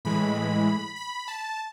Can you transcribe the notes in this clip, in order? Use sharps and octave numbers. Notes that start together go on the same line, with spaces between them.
A2 E3 G#3 B5
B5
A5